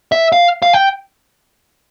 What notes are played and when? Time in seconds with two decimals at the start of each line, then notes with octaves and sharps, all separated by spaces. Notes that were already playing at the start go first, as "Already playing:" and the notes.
0.12 E5
0.32 F5
0.62 F5
0.73 G5